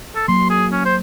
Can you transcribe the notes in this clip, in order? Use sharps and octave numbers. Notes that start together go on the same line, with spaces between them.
A4
F#3 A#3 C6
G#4
C#4
C5